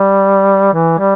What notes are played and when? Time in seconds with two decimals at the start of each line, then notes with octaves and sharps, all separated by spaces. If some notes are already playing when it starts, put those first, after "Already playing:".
Already playing: G3
0.73 E3
0.99 G3